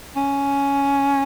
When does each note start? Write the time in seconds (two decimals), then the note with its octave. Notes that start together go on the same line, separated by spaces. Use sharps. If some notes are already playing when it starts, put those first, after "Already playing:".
0.16 C#4